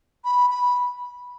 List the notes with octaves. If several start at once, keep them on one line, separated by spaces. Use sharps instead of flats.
B5
B5